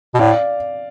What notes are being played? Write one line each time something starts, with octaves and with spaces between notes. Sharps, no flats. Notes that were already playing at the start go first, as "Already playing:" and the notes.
B2
A2 D5 F5